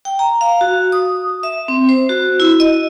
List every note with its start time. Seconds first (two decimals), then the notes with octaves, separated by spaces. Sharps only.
0.05 G5
0.19 A#5
0.41 F5
0.61 F#4
0.92 D#6
1.43 E5
1.68 C4
1.89 C5
2.09 F#4
2.40 E4
2.60 D#5